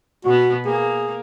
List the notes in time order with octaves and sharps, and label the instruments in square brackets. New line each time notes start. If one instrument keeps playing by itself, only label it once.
[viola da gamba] B2 B3 [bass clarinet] F#4
[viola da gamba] A#3 [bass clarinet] G#4